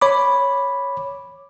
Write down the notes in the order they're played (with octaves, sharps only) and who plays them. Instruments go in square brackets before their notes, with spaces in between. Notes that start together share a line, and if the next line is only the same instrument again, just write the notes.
[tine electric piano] C#5 B5 D6